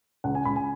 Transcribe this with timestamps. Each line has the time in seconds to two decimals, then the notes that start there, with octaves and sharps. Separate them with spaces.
0.24 C#2 F#5
0.35 G#5
0.45 C#2 B5
0.56 G#5